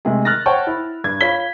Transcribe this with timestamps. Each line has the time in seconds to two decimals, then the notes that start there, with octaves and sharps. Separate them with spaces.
0.05 C3 G#3 A3 G#4
0.25 F6 F#6 A6 A#6
0.46 C5 C#5 F#5 G5 A5 C#6
0.67 E4
1.04 G2 D4 G#6
1.20 F4 C#5 B5 G#6 B6 G7